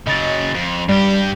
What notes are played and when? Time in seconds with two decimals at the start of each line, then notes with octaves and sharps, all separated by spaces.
0.07 C#3 F#3 D#5 A6
0.54 F2
0.89 G2 G3 G4